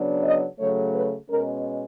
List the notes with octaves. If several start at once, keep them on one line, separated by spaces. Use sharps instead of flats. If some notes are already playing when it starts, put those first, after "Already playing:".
Already playing: C#3 F#3 B3 D4
D#5
C#3 F#3 A3 C#5
B4
B2 G#3 C#4 A#4